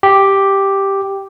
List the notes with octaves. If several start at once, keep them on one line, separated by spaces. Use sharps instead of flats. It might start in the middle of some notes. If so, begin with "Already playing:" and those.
G4